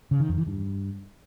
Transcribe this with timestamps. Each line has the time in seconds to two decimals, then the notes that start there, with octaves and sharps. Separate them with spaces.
0.11 C#3
0.20 D#3
0.29 F2
0.38 E3
0.47 G2